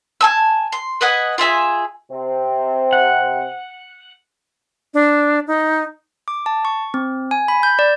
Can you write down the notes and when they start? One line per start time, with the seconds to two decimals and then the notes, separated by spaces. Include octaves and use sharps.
0.21 G#5 A5 E6
0.72 C6
1.01 B4 D#5 F#5 G#5
1.38 F4 G#4 E5 G#5
2.10 C3 C4
2.93 F#5
4.94 D4
5.47 D#4
6.28 D6
6.46 A5
6.65 C#6
6.94 C4
7.31 G#5
7.48 B5
7.63 G6
7.79 D5